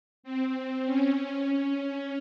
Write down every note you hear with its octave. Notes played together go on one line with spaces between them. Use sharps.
C4
C#4
C#4